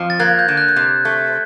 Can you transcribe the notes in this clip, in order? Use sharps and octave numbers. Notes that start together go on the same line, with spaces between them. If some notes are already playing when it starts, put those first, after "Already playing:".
Already playing: F2 F3
A6
A#3 F#6 G#6
G6
D3
F#6
G6
C3 F#6
A3